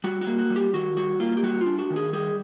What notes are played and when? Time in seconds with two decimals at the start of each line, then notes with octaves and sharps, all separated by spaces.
0.04 G3 F#4
0.21 F#4
0.27 A#3
0.38 F#4
0.50 G3
0.56 G4
0.73 D#3 F#4
0.97 G3 F#4
1.20 A#3 F4
1.37 G4
1.43 G3 F#4
1.61 F4
1.66 D4
1.79 F#4
1.90 D#3
1.96 G#4
2.13 G3 G#4